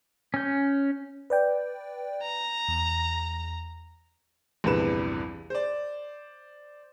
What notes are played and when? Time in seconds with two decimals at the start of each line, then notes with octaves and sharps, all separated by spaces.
0.34 C#4 G6
1.30 B4 D5 G5
2.23 A#5
2.68 E2
4.64 A#1 E2 G2 C3 B4 E7
5.50 C5 D5